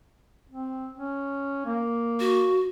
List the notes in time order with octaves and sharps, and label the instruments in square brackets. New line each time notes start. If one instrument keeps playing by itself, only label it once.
[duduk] C4
C#4
A#3
[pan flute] F#4